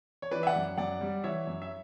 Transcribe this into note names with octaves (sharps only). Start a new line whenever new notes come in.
C#5
E3 B4 D5
E5
D5 F#5
F#2
F#2 D5 F#5
G3
E3 C#5 E5
F#2
E5